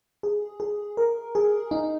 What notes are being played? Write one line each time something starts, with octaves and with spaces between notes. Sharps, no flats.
G#4
G#4
A#4
G#4
D#4